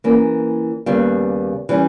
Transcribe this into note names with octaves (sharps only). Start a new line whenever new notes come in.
E3 A#3 C#4
D#2 C#3 G3 B3
E3 G3 C#4